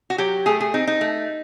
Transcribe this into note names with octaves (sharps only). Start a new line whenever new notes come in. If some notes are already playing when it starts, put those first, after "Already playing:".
F#4
F#3 G4
A3 G#4
G#4
C4 D#4
D#4
A3